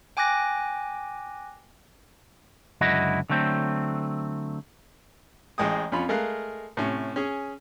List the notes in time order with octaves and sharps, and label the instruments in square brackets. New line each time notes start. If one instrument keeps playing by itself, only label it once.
[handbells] G5 G#5 D6 F#6 A#6
[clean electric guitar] C#2 F#2 D3 E4 F#4 D#5
D3 F#3 A3 C4
[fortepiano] A1 A2 G#3 G5 D#6
F2 C#4 F4 B5
G#3 A3 A#4 F5 F#6
A2 C3 C#4
C#4 G#4